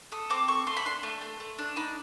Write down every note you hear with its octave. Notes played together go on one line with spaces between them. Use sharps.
A4 D#6
C4 D6
A4 C#6
A3 C6
B5
D4 C6
A3
A3
A3
D4
D#4 B5